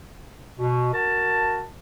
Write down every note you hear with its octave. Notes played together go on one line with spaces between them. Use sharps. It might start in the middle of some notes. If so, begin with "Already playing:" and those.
B2
F#4 A#4 A5